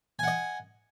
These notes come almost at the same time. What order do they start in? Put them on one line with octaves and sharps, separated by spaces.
G#5 F#5 D#5